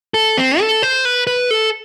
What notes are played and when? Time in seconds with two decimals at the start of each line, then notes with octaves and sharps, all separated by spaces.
0.14 A4
0.37 C4
0.60 A4
0.83 C5
1.05 B4
1.27 B4
1.51 A4